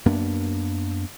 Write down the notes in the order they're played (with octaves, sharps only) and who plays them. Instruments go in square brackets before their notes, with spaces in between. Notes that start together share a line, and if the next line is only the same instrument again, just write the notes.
[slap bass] F#2 A#3 B3 D4